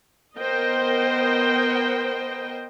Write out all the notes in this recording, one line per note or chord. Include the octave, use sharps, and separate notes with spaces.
B3 A#4 C5 D#5 G5